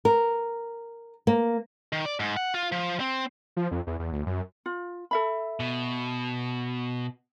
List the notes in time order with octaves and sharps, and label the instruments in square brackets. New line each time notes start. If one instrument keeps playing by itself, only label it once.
[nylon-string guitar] A#4
A#3
[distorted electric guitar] D#3
D5
G#2
F#5
F4
F3
C4
[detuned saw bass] F3
F2
E2
E2
D2
F#2
[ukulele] F4
A4 E5 B5
[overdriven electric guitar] B2